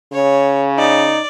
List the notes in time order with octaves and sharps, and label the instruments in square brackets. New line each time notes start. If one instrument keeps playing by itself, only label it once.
[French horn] C#3 [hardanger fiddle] C#5
[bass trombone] D#4 [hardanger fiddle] D5